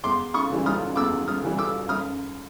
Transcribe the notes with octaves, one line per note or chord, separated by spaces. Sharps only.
E2 C6 D6
C#6 D#6
C#3 E3 G3
D#6 F6
E2 D6 E6
D#6 F6
C#3 E3 G3
D6 E6
F#2 D#6 F6